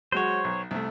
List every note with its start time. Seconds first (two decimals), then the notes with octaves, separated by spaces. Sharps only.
0.12 F#3 G#3 F#4 C5 C#5
0.44 B1
0.71 C2 A3